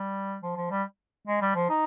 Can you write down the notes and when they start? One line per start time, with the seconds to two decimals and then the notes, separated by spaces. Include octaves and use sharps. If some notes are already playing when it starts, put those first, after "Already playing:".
Already playing: G3
0.43 F3
0.57 F3
0.70 G3
1.27 G#3
1.41 G3
1.55 F3
1.69 D#4